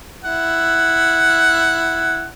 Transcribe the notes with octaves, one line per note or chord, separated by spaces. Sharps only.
E4 F#5